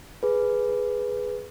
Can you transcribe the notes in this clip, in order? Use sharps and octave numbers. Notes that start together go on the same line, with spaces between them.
G#4 B4